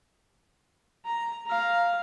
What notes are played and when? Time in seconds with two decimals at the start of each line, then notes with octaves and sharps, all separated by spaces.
1.05 A#5
1.46 F5 A#5